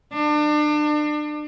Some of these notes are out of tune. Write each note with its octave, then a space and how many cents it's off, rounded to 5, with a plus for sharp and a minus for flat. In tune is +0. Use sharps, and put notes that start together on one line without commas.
D4 +35